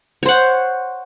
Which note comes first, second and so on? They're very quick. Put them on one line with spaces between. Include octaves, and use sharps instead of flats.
C#5 C5 F#5